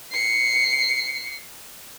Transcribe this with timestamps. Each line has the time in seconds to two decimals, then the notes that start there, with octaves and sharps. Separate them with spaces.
0.11 C7 C#7